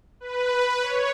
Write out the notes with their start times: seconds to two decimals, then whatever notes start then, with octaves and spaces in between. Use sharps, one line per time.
0.20 B4
0.82 C#5